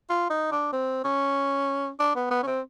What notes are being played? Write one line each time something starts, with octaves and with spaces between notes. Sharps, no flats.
F4
D#4
D4
C4
C#4
D4
B3
B3
C#4
C4